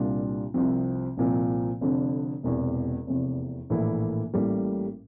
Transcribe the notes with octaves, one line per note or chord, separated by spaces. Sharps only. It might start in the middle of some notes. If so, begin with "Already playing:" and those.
Already playing: C2 A#2 G3 D4 F4
C2 C3 F3 C4
C2 A#2 F3 C4
F1 F2 D3
E1 E2 C3
F1 E2 C3
A#1 A2 E3 A#3 E4
A1 A2 G3 A#3